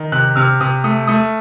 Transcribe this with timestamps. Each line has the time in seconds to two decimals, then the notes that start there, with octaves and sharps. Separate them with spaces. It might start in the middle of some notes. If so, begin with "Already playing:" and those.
Already playing: D#3
0.12 C3 F#6
0.36 C3 F6
0.61 C3 D#6
0.84 A3 D#6
1.07 A3 D#6